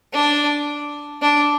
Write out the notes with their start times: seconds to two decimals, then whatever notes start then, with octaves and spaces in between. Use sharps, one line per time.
0.13 D4
1.22 D4